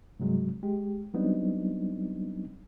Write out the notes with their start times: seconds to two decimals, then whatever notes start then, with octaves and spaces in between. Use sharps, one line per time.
0.20 G2 C3 F#3 G#3
0.63 G#3 G4
1.14 F#3 G3 B3 C4 D4 D#4